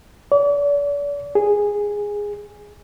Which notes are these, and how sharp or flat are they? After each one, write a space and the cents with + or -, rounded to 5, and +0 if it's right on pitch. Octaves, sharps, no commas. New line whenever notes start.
D5 -40
G#4 -10